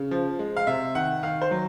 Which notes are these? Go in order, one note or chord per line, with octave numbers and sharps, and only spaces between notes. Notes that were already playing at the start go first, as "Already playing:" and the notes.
Already playing: C#3
F3
G#3
F5
C3 E5
D#3 F#5
D#3 F5
C5
F#3